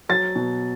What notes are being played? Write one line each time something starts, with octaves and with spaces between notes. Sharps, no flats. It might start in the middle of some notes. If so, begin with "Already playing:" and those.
F#3 A6
B2